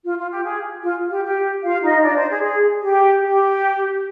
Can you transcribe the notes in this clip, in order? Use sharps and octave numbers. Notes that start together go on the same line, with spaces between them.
F4
F4
G4
G#4
F4
G4
G4
F4 F5
D#4 D#5
D4 D5
C5
G#4
G#4
G4
G4